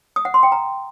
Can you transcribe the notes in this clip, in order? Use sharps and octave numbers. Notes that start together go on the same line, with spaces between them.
D#6
F#5
C6
G5
A#5